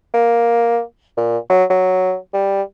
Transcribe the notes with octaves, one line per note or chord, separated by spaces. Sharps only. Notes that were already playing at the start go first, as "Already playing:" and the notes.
A#3
A#2
F#3
F#3
G3